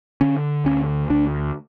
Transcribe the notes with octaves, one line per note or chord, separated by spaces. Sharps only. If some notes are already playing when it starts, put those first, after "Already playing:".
D3 C#4
D2 C#4
D2 D4